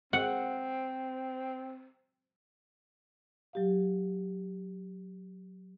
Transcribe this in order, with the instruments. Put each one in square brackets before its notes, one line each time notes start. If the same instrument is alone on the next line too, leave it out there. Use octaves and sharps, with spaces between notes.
[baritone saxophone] C4 [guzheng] F#5
[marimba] F#3 G4 F5